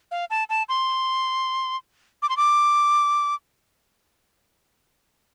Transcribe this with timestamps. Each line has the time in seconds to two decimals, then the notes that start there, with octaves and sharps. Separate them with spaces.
0.11 F5
0.30 A5
0.49 A5
0.69 C6
2.22 D6
2.29 C6
2.37 D6